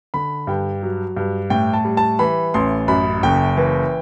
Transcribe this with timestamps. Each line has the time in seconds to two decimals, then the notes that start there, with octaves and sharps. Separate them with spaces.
0.14 D3 B5
0.47 G2 G5
0.83 F#3
1.17 G2
1.50 A2 G5
1.74 A5
1.85 G3
1.97 A5
2.19 E3 B5
2.54 A1 C6
2.88 F#2 B5
3.23 F#1 G5
3.57 E3